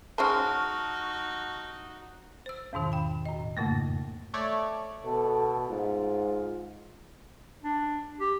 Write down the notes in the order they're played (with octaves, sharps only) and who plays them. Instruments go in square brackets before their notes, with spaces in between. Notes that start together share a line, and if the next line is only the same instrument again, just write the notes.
[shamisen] G#3 C#4 C5 [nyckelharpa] D#4 F#4 [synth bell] A5 C#6 F6
[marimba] C5 E6
E2 G#2 B2 D#3
G5 B5
A2 D#5
F2 G#2 C#3 A3 A#3
[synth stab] A3 C#5 D5
[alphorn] B2 [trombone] A4
[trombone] G#2 [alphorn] F4
[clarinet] D4
G4